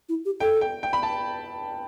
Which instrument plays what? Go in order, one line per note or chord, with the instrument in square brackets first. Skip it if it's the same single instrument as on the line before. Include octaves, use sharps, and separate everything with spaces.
[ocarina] E4
G4
[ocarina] A4 [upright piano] G5
[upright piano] G5
G5
B5
A5